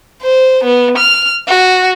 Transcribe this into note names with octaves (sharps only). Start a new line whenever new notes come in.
C5
B3
F6
F#4